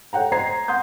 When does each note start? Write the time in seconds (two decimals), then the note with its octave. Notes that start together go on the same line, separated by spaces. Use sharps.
0.13 A4 C#5 F#5 G5 A#5
0.32 C5 D#5 A#5 G#6 C7
0.68 F#5 C6 D#6 G6